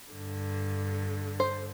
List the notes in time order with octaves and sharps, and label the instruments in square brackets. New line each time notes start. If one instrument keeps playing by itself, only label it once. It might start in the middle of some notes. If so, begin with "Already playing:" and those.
[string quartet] G2 D3
[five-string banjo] C5